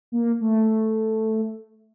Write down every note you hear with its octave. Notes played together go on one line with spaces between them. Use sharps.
A#3
A3